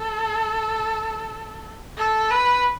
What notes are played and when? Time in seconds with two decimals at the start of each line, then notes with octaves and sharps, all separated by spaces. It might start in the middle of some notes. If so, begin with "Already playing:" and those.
Already playing: A4
1.97 A4
2.30 B4